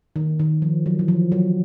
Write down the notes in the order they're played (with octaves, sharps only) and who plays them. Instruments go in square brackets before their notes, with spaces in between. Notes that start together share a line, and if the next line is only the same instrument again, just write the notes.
[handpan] D#3
D#3
F3
F#3
E3
F3
F#3